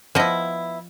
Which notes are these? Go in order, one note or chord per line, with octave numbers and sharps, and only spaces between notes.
F3 B3 E4 D#5